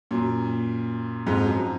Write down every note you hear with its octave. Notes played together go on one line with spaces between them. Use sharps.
F#2 A#2
F2 G#2
F#2